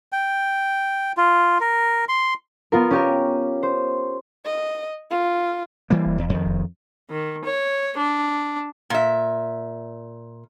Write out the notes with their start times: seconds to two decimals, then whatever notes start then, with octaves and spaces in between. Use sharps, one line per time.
0.12 G5
1.17 F4
1.61 A#4
2.09 C6
2.72 B3 F4 A#4
2.91 C#4 G4 A#4
3.63 C5
4.45 D#5
5.11 F4
5.90 E3 G3 A#3
6.05 E1
6.18 E2
6.29 F2 D#3
6.45 E1
7.11 D#3
7.45 C#5
7.98 D4
8.90 A#2 E5